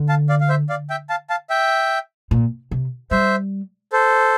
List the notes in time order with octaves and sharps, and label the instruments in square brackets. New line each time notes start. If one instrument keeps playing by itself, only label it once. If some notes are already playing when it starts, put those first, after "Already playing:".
Already playing: [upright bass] D3
[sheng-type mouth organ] F5 A5
D5 F5
F5
C5 E5
D5 F5
E5 G5
F5 A5
F5 A5
E5 G5
[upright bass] A#2
C3
[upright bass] G3 [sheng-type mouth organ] C5 E5
[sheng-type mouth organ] A4 C5